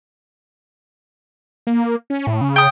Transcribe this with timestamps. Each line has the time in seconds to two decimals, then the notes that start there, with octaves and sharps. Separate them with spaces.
1.67 A#3
2.10 C#4
2.27 A2
2.41 C#3
2.56 G5 D#6